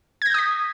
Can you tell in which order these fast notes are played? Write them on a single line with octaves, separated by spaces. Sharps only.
G#6 A#6 G6 D#6 B6